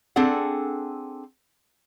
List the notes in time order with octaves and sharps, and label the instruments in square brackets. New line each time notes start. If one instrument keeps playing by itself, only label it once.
[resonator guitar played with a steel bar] C4 D4 G#4 A4 F#5